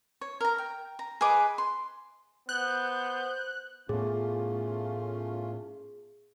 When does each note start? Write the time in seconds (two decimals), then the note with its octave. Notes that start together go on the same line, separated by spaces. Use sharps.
0.21 C#5
0.41 A#4 A#5
0.58 G5
0.99 A#5
1.21 G#4 B4 D#5 D6
1.58 C6
2.49 B3 C5 F#6 G6
3.89 A2 A3 B3 C#4 F4 G#4